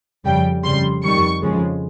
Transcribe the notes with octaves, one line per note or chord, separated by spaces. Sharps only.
F2 C#3 G3 G5
F2 C#3 G3 C6
F2 D#3 G3 C#6
F2 C#3 F3 G#3